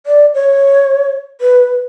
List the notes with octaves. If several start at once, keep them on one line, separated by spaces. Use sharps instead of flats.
D5
C#5
B4